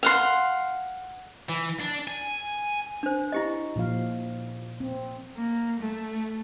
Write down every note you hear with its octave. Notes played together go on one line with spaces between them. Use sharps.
F5 F#5 C6
E3
D4
G#5
D4 C5
E4 G4 D#5
A#2 F3 F5
C4
A#3
A3